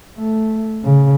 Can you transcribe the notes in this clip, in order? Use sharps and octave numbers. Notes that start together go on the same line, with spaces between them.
A3
C#3